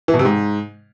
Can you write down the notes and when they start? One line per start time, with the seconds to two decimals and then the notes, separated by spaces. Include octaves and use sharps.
0.08 E3
0.14 B2
0.19 C3
0.25 G#2